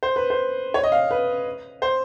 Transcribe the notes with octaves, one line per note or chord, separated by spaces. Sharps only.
C5
B4
C5
C#5
D#5
F5
B4
C5